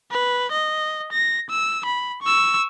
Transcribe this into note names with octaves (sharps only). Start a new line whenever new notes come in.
B4
D#5
A#6
E6
B5
C#6 E6